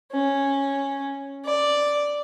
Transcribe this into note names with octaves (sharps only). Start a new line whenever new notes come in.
C#4
D5